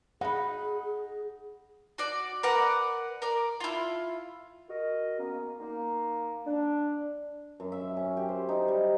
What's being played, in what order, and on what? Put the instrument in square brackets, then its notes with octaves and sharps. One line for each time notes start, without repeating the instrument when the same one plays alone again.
[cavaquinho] D#4 B5 [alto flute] G#4 [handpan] F#5
[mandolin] F#4 D5
A#4 B4 D5 F#5
A#4 D5
E4 F4
[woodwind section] F#4 A#4 D#5
A#3 B3 C#4
A#3 D#4
D4
[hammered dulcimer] F#2
E5
C#4
G4
C5
D#4
G3